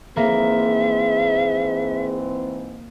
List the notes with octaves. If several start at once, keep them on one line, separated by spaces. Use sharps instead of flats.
G#2 E3 A#3 C4 G#4 E5